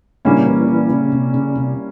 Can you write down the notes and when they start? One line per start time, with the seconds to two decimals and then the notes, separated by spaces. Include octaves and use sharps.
0.25 A#2 C#3 G3 A#3 C#4 E4
0.46 E3
0.68 E3
0.90 C#3
1.12 C3
1.34 C#3
1.56 C3